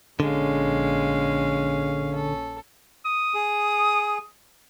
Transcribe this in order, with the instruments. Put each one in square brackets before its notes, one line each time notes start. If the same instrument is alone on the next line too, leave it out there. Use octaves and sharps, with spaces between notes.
[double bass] A#1 C#4 [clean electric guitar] D3 [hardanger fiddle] G#3 F5
[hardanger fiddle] A4
[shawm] D#6
[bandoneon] G#4